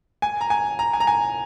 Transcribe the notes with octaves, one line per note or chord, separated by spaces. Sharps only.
G#5
A#5
G#5
A#5
G#5
A#5
G#5